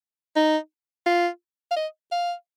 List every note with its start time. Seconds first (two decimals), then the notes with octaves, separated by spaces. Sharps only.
0.36 D#4
1.06 F4
1.71 F5
1.76 D#5
2.12 F5